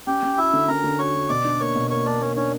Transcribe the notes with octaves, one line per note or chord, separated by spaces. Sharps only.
C#4 G4 G5
C#4
E4 F#4 E5
D3
C#4 A#4 A#5
D3
F#4 C#5 C#6
F#4
B2 D5 D6
D4
A#3 C#5 C#6
B2
A#3 C#5 C#6
A#3 D4 D5
A#3 C#4 C#5
C#4 D4 C#5